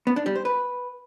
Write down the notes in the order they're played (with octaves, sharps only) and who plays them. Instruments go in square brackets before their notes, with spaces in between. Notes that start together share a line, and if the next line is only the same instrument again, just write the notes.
[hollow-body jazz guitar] B3
D4
G3
C5
B4